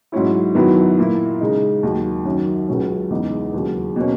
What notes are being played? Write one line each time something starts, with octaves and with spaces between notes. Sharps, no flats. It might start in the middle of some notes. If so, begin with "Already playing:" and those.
G#2 F#3 C#4 E4
F#2 D#3 F#3 B3 E4
A#2 A#3 E4
C#3 G#3 D#4
D#2 D#3 F#3
F#2 D#3 F#3 C#4
C#2 C#3 F#3 C#4
E2 C#3 G#3 D#4
D#2 C#3 F#3
B2 A#3 C#4